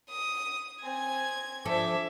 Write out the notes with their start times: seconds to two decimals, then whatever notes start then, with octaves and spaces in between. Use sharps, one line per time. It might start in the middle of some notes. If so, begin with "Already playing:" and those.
0.10 D#6
0.83 C4 G#5 G#6
1.65 F3 D4 A4 E5 D6